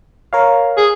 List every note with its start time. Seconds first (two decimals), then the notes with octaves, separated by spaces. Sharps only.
0.33 A#4 C#5 F5
0.77 G#4